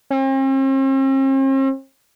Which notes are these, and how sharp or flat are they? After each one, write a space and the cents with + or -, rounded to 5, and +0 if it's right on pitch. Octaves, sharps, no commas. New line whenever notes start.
C4 +45